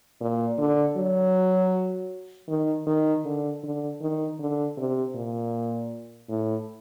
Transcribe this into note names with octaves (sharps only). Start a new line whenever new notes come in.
A#2
D3
F#3
D#3
D#3
D3
D3
D#3
D3
C3
A#2
A2